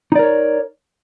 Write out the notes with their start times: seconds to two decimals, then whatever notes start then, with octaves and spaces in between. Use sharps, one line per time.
0.12 D#4
0.15 D5
0.19 A#4
0.23 C#5